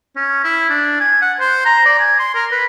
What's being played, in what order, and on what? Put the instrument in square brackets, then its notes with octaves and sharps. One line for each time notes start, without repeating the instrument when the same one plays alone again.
[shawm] C#4
E4
D4
G#5
F#5
C5
A#5
D5
G#5
C6
A#4
B4